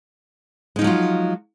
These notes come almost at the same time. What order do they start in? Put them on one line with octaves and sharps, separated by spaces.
G#3 D#4 F3 F#3 F4